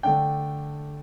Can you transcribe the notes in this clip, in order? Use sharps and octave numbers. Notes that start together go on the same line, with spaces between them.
D3 A3 D4 G5